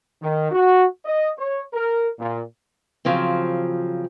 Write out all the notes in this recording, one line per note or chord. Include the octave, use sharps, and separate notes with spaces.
D#3
F#4
D#5
C#5
A#4
A#2
C#3 F3 F#3 C4